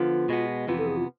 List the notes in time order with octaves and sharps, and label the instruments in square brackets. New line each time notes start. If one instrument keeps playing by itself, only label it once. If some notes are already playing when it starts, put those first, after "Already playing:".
Already playing: [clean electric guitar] D3 F3 B3 [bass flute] F4
[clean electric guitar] B2 G#3 B3
[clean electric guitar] F2 C3 E3 B3 [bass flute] F4
[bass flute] A4
G#4
F4